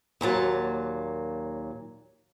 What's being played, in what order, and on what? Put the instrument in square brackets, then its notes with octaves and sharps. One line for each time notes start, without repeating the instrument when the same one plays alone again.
[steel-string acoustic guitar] D#2 A#2 F#3 A5